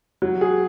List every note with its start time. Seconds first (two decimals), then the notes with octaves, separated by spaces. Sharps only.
0.22 F#3
0.41 G#4